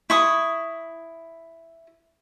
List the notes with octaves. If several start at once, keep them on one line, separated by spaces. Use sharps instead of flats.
E4 C#6 D#6